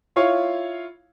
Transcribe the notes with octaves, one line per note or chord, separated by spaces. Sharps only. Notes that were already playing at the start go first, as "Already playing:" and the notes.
E4 F4 C#5 F5 C#6